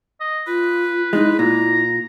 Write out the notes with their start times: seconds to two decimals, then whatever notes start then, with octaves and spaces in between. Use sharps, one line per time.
0.20 D#5
0.47 F4 B4
1.13 G#3 D#4 E4
1.39 A#2 A#5